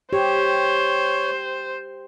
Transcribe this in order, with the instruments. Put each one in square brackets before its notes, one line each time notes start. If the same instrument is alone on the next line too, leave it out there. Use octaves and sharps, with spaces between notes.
[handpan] G4 [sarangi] C5 [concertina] C#5